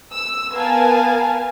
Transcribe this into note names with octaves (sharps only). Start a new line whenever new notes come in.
E6
B3 A#4 F5 G#5 A5